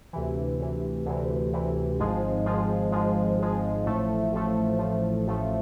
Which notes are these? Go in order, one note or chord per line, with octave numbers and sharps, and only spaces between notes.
D2 C3 E3
D2 C3 E3
D2 C3 E3
D2 C3 E3
G#1 G#2 F3 G#3
G#1 G#2 F3 G#3
G#1 G#2 F3 G#3
G#1 G#2 F3 G#3
A1 A2 F3 A3
A1 A2 F3 A3
A1 A2 F3 A3
A1 A2 F3 A3